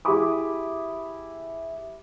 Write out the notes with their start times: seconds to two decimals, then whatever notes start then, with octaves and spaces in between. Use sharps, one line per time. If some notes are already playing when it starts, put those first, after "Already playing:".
0.05 E4 G4 G#4 B5 D6 D#6